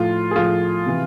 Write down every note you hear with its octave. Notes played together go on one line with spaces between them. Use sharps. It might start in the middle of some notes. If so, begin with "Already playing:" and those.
Already playing: A2 F3 F4
G#4
A2 F3 F4
C3 E3